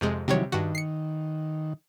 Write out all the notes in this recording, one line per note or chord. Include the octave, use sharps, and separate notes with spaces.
F2 C3 G#3
C3 D#3 E3 F#3 G3 C#5
G2 D#3 F#4
C7 C#7